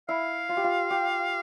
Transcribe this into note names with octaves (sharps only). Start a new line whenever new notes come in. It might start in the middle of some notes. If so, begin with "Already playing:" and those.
E4 F5
F4
G4
F4
G4